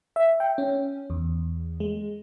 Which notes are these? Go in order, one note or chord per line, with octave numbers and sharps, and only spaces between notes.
E5
G5
C#4
E2
G#3